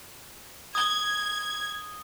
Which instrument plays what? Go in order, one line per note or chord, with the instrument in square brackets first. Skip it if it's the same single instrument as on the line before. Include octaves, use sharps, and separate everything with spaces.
[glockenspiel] D#6 G7 [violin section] G#6